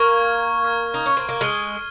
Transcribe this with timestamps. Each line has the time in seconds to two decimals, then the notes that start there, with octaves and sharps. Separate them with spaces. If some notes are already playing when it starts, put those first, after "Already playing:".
Already playing: A#3 C#6 F6 G#6
0.64 C#6 F6 G#6
0.94 D#4
1.06 C#4
1.17 C4
1.29 A#3
1.41 G#3 F6 C7 D#7 G7